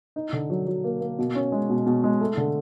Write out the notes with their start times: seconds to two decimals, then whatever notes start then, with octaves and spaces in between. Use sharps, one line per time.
0.16 D#4
0.33 D3
0.50 F#3
0.67 F#3
0.84 A#3
1.01 A#3
1.19 B2
1.35 C#4
1.52 G#3
1.69 B2
1.87 B2
2.04 G#3
2.21 A3
2.37 D3